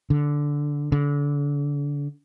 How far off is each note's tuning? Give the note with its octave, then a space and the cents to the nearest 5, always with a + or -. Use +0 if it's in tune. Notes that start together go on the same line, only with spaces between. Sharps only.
D3 -5
D3 -30